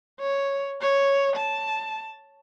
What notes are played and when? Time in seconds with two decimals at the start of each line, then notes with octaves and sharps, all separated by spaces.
0.21 C#5
0.82 C#5
1.37 A5